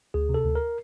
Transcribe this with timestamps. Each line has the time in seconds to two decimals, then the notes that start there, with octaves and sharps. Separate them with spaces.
0.14 D2 G#4
0.29 C3
0.34 A4
0.45 D2
0.55 A#4